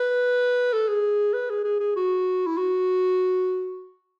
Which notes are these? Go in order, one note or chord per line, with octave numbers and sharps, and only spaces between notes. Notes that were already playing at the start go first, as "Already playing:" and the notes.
Already playing: B4
A4
G#4
B4
G#4
G#4
G#4
F#4
E4
F#4